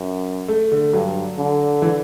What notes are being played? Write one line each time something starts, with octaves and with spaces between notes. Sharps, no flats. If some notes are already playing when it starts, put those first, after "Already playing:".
Already playing: F#2
A3
D3
G2 F#3
D3
E3